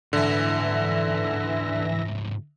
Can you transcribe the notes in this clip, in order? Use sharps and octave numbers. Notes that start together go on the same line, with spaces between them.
D2 G#2 D3 E3 E5 A#6